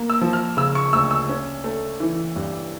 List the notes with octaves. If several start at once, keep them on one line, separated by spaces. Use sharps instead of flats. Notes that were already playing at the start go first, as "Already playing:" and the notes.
Already playing: A#3
E6
F3
F6
C#3 E6
C#6
D2 E6
E6
C#4
A3
E3
G2